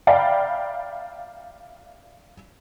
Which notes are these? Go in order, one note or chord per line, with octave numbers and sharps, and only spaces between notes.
D5 E5 F5 G5 A#5 B5